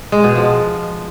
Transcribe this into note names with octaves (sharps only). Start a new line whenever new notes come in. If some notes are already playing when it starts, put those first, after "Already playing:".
G#3
B2
F3